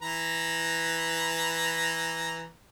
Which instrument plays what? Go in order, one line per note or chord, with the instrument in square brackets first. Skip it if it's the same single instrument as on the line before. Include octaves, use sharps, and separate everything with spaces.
[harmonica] E3 B4 A#5